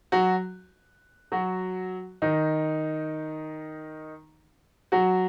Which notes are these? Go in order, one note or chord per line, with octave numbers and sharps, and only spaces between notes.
F#3 F#4
F#3 F#4
D#3 D#4
F#3 F#4